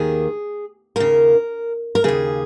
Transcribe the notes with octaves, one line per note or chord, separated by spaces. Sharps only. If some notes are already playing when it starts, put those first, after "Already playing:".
Already playing: D#2 D#3 G#4
D#2 C#3 A#4
A#4
D#2 C#3 G#4